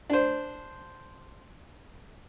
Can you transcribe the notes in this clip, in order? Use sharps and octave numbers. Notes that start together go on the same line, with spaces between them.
D4 C5